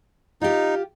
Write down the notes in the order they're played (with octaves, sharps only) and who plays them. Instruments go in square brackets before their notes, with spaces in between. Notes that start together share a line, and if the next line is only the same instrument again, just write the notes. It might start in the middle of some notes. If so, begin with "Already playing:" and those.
[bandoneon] D#4 [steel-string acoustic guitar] F4 G4